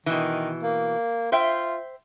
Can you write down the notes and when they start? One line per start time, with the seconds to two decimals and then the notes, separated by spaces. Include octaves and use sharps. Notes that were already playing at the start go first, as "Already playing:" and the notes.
0.06 B2 D#3 E3
0.63 A#3
1.32 F4 C5 E5 G5